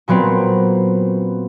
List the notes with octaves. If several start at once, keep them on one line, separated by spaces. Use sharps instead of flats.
A#2 F#3 B3 C4